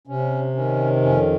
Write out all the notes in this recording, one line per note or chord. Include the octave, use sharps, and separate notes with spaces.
C3 C#4
D#3 C#4
F2 C#4